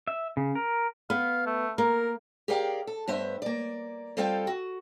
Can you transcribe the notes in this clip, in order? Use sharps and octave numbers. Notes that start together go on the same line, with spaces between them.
E5
C#3
A#4
B3 F5
A3
A#3 A#4
G4 G#4 A#4 D5 F5 G5
A4
G2 B3 C5 E5
A#3 D5
G3 C4 F4 A4 F5 G5
F#4